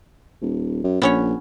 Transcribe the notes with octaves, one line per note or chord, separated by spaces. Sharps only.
D#1
F#2
A#1 B3 C#4 C#5